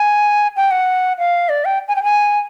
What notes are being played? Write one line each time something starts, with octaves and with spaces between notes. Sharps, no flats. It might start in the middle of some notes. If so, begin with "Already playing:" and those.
Already playing: G#5
G5
F#5
F5
D5
G5
G#5
G5
G#5